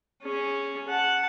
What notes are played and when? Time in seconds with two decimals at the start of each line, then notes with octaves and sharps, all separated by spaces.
0.23 C#4 G#4
0.88 F#5 A5